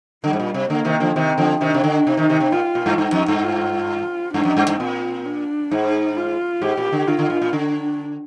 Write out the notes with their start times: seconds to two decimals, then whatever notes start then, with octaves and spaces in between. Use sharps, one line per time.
0.24 D3 G3
0.33 G#2
0.40 A#2
0.54 C3
0.70 D3 A#3
0.85 C3 D#3
1.00 D3 F3
1.15 C3 D#3 C4
1.38 D3 F3
1.61 C3 D#3 D4
1.74 C3
1.84 D3
2.07 C3 D#4
2.17 C3 D#3
2.30 C3 D#3
2.40 C3
2.52 A#2 F4
2.75 A#2
2.86 G2
2.98 G2 D#4
3.13 F2
3.28 G2
3.43 F4
4.34 G2 D4
4.45 F2
4.57 G2
4.68 G2
4.80 A#2 C4
5.25 D4
5.70 G#2 D#4
6.16 F4
6.62 G#2 G4
6.77 A#2
6.92 D3
7.07 D3 F4
7.19 D3
7.30 A#2
7.42 A#2
7.53 D3 D4